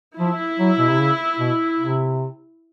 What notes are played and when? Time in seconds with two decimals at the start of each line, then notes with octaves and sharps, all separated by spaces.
0.19 F3 E4
0.60 F#3
0.79 B2
0.89 C3
1.00 C#3
1.39 B2
1.79 C3